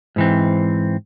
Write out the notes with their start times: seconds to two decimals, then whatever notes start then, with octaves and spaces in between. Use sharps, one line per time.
0.16 G#2 E3 C4